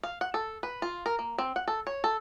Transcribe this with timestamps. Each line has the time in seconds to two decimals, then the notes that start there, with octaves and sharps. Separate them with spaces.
0.03 F5
0.21 F#5
0.34 A4
0.63 B4
0.82 F4
1.06 A#4
1.19 A#3
1.38 C4
1.56 F#5
1.68 A4
1.87 C#5
2.04 A4